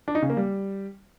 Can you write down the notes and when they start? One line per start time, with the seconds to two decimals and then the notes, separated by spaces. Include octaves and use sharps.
0.08 D4
0.15 D#4
0.22 C#3
0.30 A#3
0.37 G3